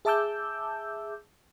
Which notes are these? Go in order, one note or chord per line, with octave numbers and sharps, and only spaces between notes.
G#4 E5 A5 D6 E6 G6